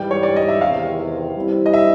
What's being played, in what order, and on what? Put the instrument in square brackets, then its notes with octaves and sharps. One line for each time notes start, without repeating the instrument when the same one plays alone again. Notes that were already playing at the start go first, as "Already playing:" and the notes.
Already playing: [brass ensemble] G#2 E3 G3 [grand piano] G5
[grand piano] C#5
D5
D#5
E5
[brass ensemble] E2 C3 D#3 [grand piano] F5
[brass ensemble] G3 C4 E4
[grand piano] D#5
E5